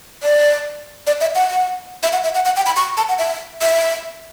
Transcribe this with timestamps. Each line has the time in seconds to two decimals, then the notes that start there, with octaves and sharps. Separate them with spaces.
0.23 D5
1.07 D5
1.21 E5
1.35 F#5
1.50 F#5
2.03 E5
2.12 F#5
2.24 E5
2.35 F#5
2.45 F#5
2.56 G5
2.66 B5
2.76 C#6
2.97 A5
3.09 F#5
3.18 E5
3.62 E5